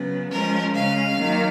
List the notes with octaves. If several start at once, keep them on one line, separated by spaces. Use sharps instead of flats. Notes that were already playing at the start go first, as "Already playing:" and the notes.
Already playing: C#3 F#3 B3
F3 G#3 C#4 A#4
C#3 G#3 C#4 F5
D#3 F#3 A#3